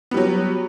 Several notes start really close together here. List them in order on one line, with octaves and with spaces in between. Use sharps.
B3 G3 F#3